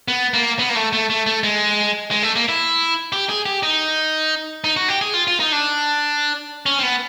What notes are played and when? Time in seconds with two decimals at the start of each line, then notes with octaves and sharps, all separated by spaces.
0.08 B3
0.34 A#3
0.59 B3
0.69 A#3
0.76 A3
0.93 A3
1.10 A3
1.26 A3
1.43 G#3
2.11 G#3
2.23 A3
2.36 A#3
2.49 E4
3.12 G4
3.29 G#4
3.46 G4
3.63 D#4
4.64 D#4
4.76 F#4
4.89 G4
5.01 G#4
5.14 F4
5.28 F4
5.40 D#4
5.52 D4
6.66 C#4
6.79 C4
6.83 B3